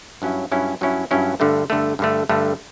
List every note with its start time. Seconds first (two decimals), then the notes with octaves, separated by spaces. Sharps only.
0.22 G2 F#3 C#4 E4
0.51 G2 F#3 C#4 E4
0.81 G2 F#3 C#4 E4
1.11 G2 F#3 C#4 E4
1.40 G2 D3 A3
1.70 G2 D3 A3
1.99 G2 D3 A3
2.29 G2 D3 A3